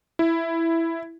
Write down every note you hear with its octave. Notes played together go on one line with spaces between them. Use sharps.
E4